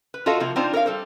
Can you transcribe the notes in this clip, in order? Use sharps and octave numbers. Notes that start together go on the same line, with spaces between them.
B4
F4 F#4 A4 D#5 F5
C3 F3 A#3 F4
C4 D4 D#4 F4 C5
A#4 C#5 D5 F5
G3 A4 C5